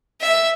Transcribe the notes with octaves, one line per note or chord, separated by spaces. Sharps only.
E5